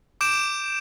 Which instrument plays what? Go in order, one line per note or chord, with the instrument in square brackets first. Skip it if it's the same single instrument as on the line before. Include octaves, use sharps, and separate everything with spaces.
[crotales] D6 G6 D7 E7